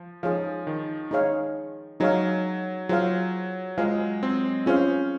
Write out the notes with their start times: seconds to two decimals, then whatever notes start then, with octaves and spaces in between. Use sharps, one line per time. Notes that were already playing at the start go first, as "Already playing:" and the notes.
Already playing: F3
0.23 F3 D#4 G#4 C#5 F5
0.67 D#3
1.11 D#4 G#4 C#5 F5
2.00 F#3 D#4 G#4 C#5 F5
2.89 F#3 F4 G#4 C5 F5
3.78 G#3 F4 G#4 C5 F5
4.23 C4
4.66 C#4 F4 G#4 C5 F5